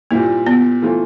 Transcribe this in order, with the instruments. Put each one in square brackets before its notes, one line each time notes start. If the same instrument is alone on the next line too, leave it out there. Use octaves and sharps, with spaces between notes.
[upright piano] A#2 G3 C4 E4 [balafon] A#3
[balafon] B3
[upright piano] E3 A3 C4 F4